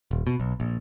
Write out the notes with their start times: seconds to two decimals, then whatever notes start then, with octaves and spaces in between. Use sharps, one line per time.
0.11 D#1
0.27 B2
0.40 B1
0.60 A#1